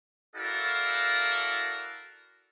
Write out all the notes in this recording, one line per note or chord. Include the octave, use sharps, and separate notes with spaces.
E4 F#4 A4 A#4 D5 F5